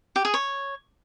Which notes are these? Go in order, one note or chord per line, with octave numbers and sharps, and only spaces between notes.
G4
G#4
C#5